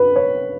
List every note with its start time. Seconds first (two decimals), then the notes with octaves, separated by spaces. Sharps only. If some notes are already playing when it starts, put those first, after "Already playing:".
Already playing: B4
0.16 C#5